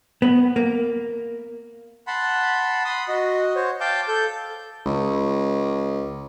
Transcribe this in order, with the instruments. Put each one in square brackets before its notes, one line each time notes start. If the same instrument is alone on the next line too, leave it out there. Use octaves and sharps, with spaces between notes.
[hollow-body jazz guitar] B3
A#3
[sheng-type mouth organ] F#5 A5 B5 C6
B5 C6 D#6
F#4 D#5
C5 C#5
F5 G5 A5 D6 G6
A4 G6
[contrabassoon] C#2